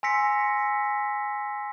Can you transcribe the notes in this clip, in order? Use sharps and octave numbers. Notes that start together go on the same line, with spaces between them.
G#5 C6 E6 A#6 B6 C#7